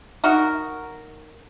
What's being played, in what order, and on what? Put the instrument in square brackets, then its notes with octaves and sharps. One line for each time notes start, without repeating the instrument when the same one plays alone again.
[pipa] D#4 F#4 A#4